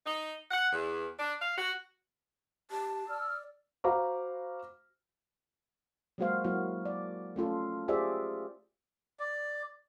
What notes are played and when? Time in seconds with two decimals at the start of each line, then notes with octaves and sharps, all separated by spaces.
0.06 D#4
0.51 F#5
0.73 E2
1.19 D4
1.41 F5
1.58 F#4
2.71 G4 A5
3.08 D5 E6 F6
3.84 F#4 C5 F5 A#5 B5 D6
6.18 F#3 G#3 A#3 F#4 C5 F5
6.44 F#3 A#3 E4 F#4
6.85 D5
7.36 A3 C#4 F4 A4
7.88 F4 G4 G#4 C5 D5 E5
9.20 D5